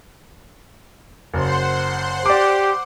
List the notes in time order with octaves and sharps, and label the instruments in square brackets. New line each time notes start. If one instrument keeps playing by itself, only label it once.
[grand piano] F#1 [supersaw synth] C5 F#5 C6
[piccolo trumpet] G4 [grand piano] D5 D6